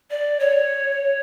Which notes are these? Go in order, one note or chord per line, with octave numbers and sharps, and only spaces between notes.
D5
C#5